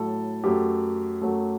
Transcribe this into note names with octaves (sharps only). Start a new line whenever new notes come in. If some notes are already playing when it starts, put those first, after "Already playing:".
Already playing: A2 F#3 A3 A4
F#2 F#3 A3 G4
F#2 F#3 A3